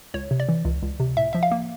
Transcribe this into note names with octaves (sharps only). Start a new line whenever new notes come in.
C#2 C#5
C3
D5
E3
C#2
C#2
C3
A2 E5
F3 E5
F5
A#3